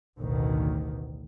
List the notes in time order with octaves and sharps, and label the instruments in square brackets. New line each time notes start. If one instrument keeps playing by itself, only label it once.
[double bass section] A1 D2 B2 D#3